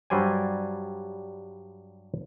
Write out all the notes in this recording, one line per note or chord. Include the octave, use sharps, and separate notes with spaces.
G2 F#3 G3 C5 D5 G#5